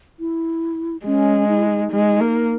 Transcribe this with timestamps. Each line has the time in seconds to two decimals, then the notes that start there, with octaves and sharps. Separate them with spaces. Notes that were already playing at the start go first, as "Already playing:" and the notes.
0.20 E4
1.05 G#3 C#4
1.49 D#4
1.58 E4
1.67 D#4
1.92 G#3
2.20 A#3